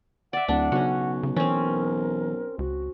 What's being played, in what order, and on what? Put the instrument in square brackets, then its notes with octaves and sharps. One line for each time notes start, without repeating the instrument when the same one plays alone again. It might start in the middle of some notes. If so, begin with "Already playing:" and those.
[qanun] D5 E5 [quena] F#5
[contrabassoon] D1 [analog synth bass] D2 [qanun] D4 [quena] F#5
[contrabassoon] B1 [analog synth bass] C#3 [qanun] C#4 F#4
[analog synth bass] C#3
[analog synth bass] E3 [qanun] C4 C#4 [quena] A#4
[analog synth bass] C#2 [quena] F#4